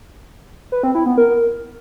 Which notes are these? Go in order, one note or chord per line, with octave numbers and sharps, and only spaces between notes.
B4
C4
E4
B3
A#4